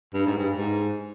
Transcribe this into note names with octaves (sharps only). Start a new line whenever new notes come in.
G2
G#2
G2
G#2